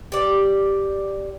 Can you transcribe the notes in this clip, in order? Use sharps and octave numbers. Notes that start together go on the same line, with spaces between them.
G4 D5